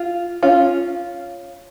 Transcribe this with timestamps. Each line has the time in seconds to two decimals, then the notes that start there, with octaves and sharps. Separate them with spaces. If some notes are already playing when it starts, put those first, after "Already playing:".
Already playing: F4
0.43 C#4 F4